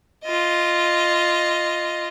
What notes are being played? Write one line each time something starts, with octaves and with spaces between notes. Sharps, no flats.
F4 D#5